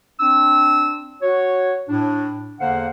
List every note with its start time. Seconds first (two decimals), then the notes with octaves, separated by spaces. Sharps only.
0.20 C4 D4 E6
1.22 F#4 C#5
1.89 A2 D4
2.60 E2 D3 A#3 C5 F5 F#5